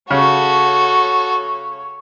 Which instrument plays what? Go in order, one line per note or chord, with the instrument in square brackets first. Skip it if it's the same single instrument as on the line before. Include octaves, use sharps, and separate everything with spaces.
[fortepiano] C#3 [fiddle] F#4 A4 [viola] C#5